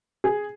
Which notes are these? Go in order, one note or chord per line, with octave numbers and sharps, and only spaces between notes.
G#4